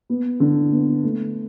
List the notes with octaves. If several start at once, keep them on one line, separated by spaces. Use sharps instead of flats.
B3
D3
B3
A3